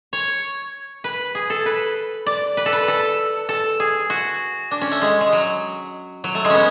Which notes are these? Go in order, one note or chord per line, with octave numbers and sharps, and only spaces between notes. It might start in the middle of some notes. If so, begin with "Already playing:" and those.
C#5
B4
G#4
A4
B4
D5
B4
A4
B4
A4
A4
G#4
F#4
D4
C#4
A3
G#3
G#3
F#3
F#3
A3
G#3
B3 C#4